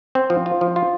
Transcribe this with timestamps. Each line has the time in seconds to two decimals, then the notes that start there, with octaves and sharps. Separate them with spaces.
0.15 C4
0.30 F3
0.46 F4
0.61 F3
0.76 F4